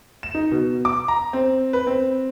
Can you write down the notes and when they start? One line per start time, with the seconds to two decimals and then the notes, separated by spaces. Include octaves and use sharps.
0.23 E7
0.35 D#4
0.52 B2
0.85 D6
1.08 A#5
1.33 C4
1.73 B4
1.87 C4